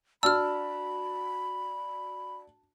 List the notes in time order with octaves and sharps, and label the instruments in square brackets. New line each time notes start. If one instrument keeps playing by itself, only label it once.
[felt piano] D4 F#4 [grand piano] A5 [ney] B5 [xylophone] E6 F6